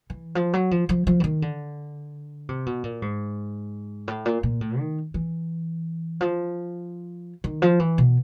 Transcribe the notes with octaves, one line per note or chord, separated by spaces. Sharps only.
E3
F3
F#3
F3
F3
F3
E3
D#3
D3
C3
B2
A#2
G#2
A2
A#2
A#2
A2
D#3
E3
F3
D#3
F3
E3
B2